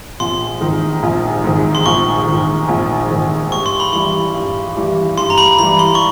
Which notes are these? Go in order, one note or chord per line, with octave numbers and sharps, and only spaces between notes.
A#1 C6
G#2 D#3
A#1
G#2 D#3
C6
A#1 C#6
G#2 D#3
A#1
G#2 D#3
G2 C#6
C6
B5
E3 G3 C6
G2
E3 G3
G2 C6
A#5
B5
E3 G3 B5
C6
C#6